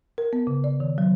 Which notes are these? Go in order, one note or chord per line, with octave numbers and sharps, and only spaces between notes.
A#4
B3
C#3
D5
D#3
F#3